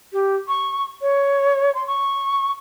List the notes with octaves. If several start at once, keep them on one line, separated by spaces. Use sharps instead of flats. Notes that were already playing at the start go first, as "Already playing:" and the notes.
G4
C#6
C#5
C6
C#6